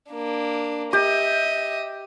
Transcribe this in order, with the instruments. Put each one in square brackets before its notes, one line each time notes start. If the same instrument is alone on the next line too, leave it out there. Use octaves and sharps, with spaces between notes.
[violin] A#3 D4
[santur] G4 [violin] D#5 E5